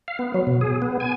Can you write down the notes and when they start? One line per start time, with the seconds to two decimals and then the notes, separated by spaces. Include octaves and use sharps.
0.08 F5
0.19 B3
0.34 F#3
0.47 B2
0.61 G#4
0.82 B3
1.00 G#5